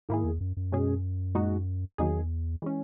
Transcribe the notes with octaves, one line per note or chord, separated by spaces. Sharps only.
G#2 D#3 A#3 E4 G#4
E2
F#2
F#2
B2 G#3 C#4 G#4
A#2 G#3 D#4 F#4
E2 D#3 F#3 A#3 D#4 G#4
E3 G#3 C#4